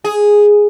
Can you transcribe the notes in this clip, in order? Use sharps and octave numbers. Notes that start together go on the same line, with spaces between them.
G#4